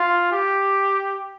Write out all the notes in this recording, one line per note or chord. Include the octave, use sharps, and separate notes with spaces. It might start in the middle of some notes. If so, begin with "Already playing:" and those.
Already playing: F4
G4